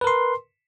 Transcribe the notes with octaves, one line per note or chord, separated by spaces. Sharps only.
A#4 B4 C6